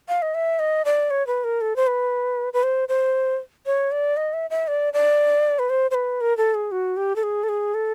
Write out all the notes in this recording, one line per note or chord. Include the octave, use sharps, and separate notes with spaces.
F5
D#5
E5
D#5
D5
C#5
B4
A#4
A4
C5
B4
B4
C5
C5
C#5
D5
D#5
E5
E5
D5
D5
B4
C5
C5
B4
A#4
A4
G#4
F#4
G4
A4
G#4
A4
G#4
A4